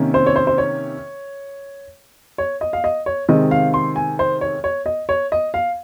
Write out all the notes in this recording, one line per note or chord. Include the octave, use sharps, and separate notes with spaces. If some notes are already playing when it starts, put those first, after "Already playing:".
Already playing: C3 D#3 A#3 C#4
C5
C#5
C5
C5
C#5
C#5
D#5
F5
D#5
C#5
C3 D#3 G#3 C4 D#5
F5
C6
G#5
C5
C#5
C#5
D#5
C#5
D#5
F5